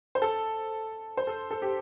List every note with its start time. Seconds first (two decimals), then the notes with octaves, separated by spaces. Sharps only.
0.15 C5
0.22 A4
1.17 C5
1.27 A4
1.51 A4
1.62 G4